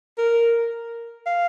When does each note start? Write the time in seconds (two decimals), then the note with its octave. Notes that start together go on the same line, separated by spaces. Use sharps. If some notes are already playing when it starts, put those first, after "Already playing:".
0.18 A#4
1.27 F5